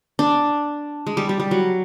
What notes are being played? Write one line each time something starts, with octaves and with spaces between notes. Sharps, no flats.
D4
G#3
G3
G3
G3
F#3